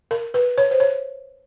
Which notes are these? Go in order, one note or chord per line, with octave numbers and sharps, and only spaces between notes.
A#4
B4
C#5
C5
C#5